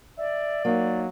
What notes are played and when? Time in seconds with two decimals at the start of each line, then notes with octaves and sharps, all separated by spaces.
0.18 D5 E5
0.65 F#3 A#3 D#4